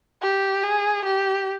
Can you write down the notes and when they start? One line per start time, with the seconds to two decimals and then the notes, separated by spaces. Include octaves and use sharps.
0.22 G4
0.64 G#4
1.05 G4